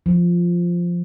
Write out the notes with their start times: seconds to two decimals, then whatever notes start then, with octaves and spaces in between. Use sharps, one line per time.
0.06 F3